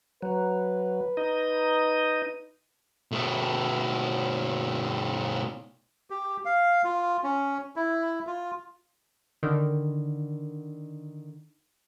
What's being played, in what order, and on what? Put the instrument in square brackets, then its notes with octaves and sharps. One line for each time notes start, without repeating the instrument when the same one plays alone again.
[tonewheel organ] F#3 [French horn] B4
[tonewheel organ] D#4 D#5
[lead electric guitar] B2 A3
[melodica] G4
F5
F4
C#4
E4
F4
[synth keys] D3 D#3